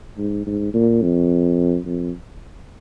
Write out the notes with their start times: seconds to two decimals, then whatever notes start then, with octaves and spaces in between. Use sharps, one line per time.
0.18 G#2
0.47 G#2
0.74 A#2
1.02 F2
1.86 F2